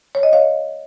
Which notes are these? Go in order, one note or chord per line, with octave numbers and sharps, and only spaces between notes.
C#5
D#5
C#5 F5